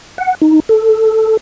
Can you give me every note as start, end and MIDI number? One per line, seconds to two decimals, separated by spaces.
0.18 0.35 78
0.42 0.60 63
0.69 1.37 69